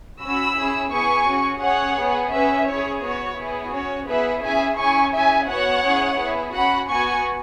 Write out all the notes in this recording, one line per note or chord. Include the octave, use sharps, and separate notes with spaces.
C#4 F#4 B5 E6
C#4 E4 G#4
B3 E4 G#4 G#5 C#6
C#4 F#4
C#4 G#4 C#5 F#5
B3 G#4
C#4 G#4 B4 E5
C#4 E4 G#4 C#5
B3 F#4 C#5
B3 E4 G#4
C#4 F#4 C#5
B3 E4 G#4 B4 E5
C#4 E4 G#4 E5 G#5
C#4 E4 G#4 G#5 C#6
C#4 E4 G#4 E5 G#5
B3 F#4 C#5 F#5
C#4 E4 G#4
B3 E4 G#4
C#4 F#4 F#5 B5
B3 F#4 G#5 C#6